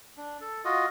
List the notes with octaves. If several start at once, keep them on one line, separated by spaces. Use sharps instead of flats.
D4
A4
F4 F#4 D#5